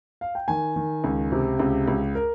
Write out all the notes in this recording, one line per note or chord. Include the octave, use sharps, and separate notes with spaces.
F5
G5
D#3 G#5
D#3
C#2
C3
C#2
C#2
A#4